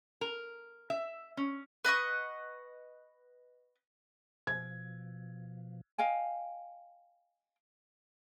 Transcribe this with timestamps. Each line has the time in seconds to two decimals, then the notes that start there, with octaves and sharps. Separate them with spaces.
0.21 A#4
0.90 E5
1.37 C#4
1.85 B4 D#5 F#5 C#6
4.47 B2 F3 G#6
5.98 D#5 F5 G5 G#5